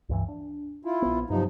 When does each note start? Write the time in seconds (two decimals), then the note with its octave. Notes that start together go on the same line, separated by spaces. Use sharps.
0.09 C#2 G2 E3
0.28 D4
0.85 E4 F4
1.02 A#1 B3
1.30 G2 C3 F3 F#3 D#4